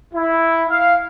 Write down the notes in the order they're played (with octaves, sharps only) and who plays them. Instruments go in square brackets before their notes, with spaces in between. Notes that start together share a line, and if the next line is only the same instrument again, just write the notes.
[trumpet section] E4
F5